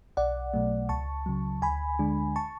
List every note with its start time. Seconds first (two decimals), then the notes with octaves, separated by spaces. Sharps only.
0.17 B1 D5 F#5
0.54 B2 F#3 A3
0.89 C#2 A5 C#6
1.26 C#3 F#3
1.62 D2 G#5 B5
1.99 D3 G#3 D4
2.36 A5 C#6